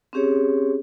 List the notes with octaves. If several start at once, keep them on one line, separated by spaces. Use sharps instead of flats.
C4 C#4 G4 G#4 C#5